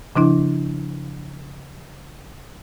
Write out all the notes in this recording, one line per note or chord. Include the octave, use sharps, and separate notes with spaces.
C#3 F3 D4 E4